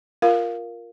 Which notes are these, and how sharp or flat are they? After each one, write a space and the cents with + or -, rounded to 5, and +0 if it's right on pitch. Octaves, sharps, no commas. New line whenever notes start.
F4 +0 A#4 +0 F5 +0